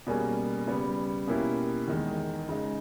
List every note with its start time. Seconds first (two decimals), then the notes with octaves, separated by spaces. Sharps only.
0.07 B2 G3 A#3 C#4 G#4
0.67 C#3 G3 B3
1.27 B2 A#3 C#4 E4 G4
1.88 E2 D#3 G#3
2.49 C#3 G#3 D#4